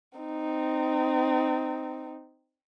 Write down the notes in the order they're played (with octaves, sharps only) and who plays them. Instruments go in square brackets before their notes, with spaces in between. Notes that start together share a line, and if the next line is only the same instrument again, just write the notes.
[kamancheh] C4 D#4